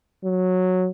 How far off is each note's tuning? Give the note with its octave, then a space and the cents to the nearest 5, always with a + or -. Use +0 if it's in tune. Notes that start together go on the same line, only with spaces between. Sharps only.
F#3 -10